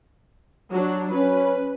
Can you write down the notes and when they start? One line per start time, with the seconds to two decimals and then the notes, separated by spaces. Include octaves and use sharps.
0.71 F#3 D4
1.13 C#4 B4